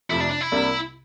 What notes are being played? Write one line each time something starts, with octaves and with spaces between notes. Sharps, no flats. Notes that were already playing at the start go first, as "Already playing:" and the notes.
F2 C3 F3 A3 E4
D4
D4
E4
C2 C3 G3 A#3 D4